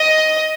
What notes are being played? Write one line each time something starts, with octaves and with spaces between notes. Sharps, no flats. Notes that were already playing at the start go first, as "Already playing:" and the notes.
Already playing: D#5